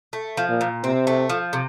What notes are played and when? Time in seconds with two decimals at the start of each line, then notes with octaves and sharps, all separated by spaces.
0.13 A3
0.37 F3
0.49 A#2
0.61 A#2
0.84 C3 C4
1.07 A3
1.30 F3
1.53 C3